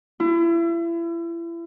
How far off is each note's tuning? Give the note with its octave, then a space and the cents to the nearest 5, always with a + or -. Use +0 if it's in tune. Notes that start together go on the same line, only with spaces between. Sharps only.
E4 +35